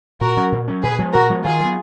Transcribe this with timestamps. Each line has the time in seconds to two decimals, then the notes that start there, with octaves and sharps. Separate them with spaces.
0.21 A#2 F#4 A#4
0.37 F#3 C#4
0.52 A#2
0.68 F#3 C#4
0.83 A#2 G#4 B4
0.98 F3 G#3 B3
1.13 A#2 F#4 A#4
1.30 F3 G#3 B3
1.44 D#3 F4 G#4
1.60 F#3 B3